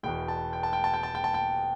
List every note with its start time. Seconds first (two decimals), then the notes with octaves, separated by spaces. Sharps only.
0.03 E1 E2 B2 G5
0.28 A5
0.53 G5
0.63 A5
0.73 G5
0.84 A5
0.94 G5
1.03 A5
1.15 G5
1.24 A5
1.34 G5